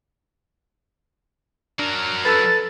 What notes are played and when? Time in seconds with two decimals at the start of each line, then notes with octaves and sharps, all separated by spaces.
1.79 F#3 D4 A#4
2.25 A4 B4 A5 E6 A6